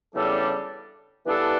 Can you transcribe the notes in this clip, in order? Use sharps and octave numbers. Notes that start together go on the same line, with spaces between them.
E2 C#3 G3 D4 A4
G2 E3 B3 D4 A4